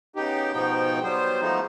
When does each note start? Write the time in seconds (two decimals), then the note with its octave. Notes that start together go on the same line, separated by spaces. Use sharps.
0.16 C#3 B3 D#4 G4
0.53 G#2 B2 F3 B3 D#4 G5
1.03 F#3 G3 B3 C5
1.41 F3 G#3 A3 B3 D#4